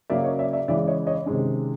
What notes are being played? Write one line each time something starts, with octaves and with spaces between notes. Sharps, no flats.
C#3 F#3 A#3 D5 E5
C#5 D#5
D5 E5
D5 E5
C#3 E3 G#3 D5 E5
C#5 D#5
C#5 D#5
C3 D#3 G#3 C#4